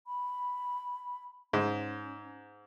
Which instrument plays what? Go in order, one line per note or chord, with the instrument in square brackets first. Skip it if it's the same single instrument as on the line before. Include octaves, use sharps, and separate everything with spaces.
[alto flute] B5
[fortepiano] G#2 [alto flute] C#4